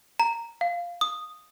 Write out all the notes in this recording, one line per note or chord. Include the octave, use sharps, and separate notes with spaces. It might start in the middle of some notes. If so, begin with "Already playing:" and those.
A#5
F5
D#6